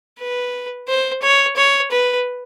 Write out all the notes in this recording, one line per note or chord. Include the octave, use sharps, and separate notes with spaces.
B4
C5
C#5
C#5
B4